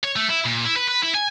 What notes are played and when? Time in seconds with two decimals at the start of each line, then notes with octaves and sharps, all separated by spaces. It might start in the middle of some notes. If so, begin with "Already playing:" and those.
0.04 C#5
0.16 A3
0.29 E4
0.45 A#2
0.65 E4
0.76 B4
0.88 B4
1.03 E4
1.15 G#5